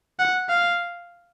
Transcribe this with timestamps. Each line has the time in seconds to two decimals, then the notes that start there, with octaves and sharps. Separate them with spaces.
0.19 F#5
0.49 F5